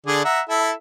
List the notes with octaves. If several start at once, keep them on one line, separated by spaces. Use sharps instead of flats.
D3 G#4 D5
E5 F#5 A#5
E4 A4 E5